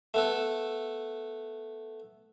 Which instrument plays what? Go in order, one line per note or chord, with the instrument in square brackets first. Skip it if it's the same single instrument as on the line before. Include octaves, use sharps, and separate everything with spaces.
[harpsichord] A3 B3 A4